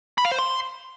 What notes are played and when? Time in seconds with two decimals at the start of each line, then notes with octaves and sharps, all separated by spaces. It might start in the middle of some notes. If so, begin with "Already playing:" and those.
0.18 B5
0.25 F5
0.32 C5
0.39 C6